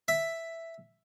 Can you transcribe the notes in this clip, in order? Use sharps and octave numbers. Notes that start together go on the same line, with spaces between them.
E5